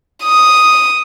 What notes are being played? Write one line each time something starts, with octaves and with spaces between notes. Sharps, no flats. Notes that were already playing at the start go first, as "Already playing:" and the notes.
D#6